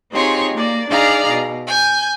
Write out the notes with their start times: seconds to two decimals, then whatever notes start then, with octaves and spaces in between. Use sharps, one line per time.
0.11 C4 D#4 F4 G4 G#4 C#5
0.54 A#3 D5
0.88 D4 D#4 G#4 D5 F5 A#5
1.29 B2
1.67 G#5 G6